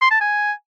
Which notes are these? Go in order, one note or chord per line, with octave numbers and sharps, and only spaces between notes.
C6
A5
G#5